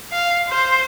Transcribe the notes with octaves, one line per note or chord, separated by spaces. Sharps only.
F5
C5